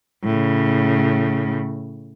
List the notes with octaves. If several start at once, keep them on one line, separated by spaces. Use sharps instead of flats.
A2 C#3